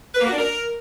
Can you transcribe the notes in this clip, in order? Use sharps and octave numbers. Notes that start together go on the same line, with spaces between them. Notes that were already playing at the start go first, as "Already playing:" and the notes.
B4
A#3
F#4
D4
A#4